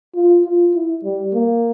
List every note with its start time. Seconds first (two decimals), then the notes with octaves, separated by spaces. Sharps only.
0.15 F4
0.44 F4
0.74 E4
1.04 G3
1.34 A#3